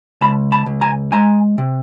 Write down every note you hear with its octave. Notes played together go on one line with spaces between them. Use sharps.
C#2 A5 B5
A5 B5
C#2
G#5 A#5
G#3 G#5 A#5
C3